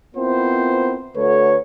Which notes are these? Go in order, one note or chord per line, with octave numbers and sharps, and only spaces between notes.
B3 C4 E4 F4 A#4 C5
D3 A3 F#4 B4 C#5